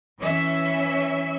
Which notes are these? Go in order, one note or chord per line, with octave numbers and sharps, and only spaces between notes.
E3 C#4 E5